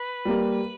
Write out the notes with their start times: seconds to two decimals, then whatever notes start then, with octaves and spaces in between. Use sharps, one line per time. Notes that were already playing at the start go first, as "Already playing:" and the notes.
Already playing: B4
0.25 G3 A#3